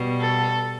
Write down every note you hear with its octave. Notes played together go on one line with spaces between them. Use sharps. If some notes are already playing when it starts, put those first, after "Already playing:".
Already playing: B2 G3
A4